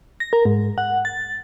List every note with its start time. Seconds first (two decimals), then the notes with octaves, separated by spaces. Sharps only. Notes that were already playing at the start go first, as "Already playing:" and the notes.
0.20 A#6
0.33 A#4
0.45 G#2
0.78 F#5
1.05 A6